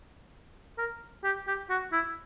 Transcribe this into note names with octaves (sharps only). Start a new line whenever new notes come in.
A#4
G4
G4
F#4
E4